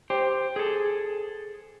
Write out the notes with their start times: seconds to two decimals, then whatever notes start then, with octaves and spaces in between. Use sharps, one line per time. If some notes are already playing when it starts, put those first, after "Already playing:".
0.10 G4 C5
0.56 G#4 A4